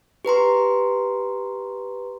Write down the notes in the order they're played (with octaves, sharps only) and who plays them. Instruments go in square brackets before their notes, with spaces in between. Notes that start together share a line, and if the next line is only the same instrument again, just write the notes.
[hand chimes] G4 B4 A#5 C6